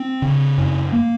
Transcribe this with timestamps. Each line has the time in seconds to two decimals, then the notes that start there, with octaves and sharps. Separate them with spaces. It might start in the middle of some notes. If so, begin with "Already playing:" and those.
Already playing: C4
0.22 C#3
0.58 F#2
0.93 A#3